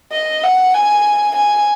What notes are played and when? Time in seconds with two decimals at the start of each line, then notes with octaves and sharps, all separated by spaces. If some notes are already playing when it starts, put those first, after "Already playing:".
0.12 D#5
0.43 F#5
0.74 G#5
1.36 G#5